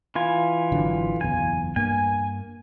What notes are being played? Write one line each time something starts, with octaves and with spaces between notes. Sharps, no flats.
E3 F4 G#5
G#1 D3 F#3
F#1 B1 E2 G#5
G2 A#3 G#5